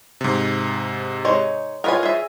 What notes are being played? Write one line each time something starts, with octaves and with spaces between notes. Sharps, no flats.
G#2 C3
G#3 D#4 C#5
F4 A#4 B4 C#5 D#5 G#5
G#4 E5